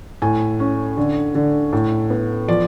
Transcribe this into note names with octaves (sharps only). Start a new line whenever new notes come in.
A2 G#5
C#4
D3
D3
A2
B3
F3 D5